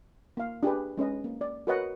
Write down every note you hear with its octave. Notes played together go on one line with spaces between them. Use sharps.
A#3 F5
D4 G4 G#4 B4
G#3 C#4 B4 D#5
A#3
D5
F#4 A#4 B4 C#5 D#5 F#5